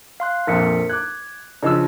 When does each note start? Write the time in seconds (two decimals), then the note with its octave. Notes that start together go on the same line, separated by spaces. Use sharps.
0.20 F5 C6 F#6
0.47 A#1 F2 A#2 A#4 B6 C#7
0.90 D6 F#6 G#6
1.63 C#3 F3 D4 D#5 E6